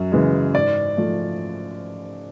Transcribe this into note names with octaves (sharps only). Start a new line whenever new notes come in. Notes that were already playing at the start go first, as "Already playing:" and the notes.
Already playing: F#2
C#3 E3 G#3
G#2 D5
F3 A3